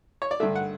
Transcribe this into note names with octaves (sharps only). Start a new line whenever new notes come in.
C#5
D5
G2 D3 A3 E5
F#5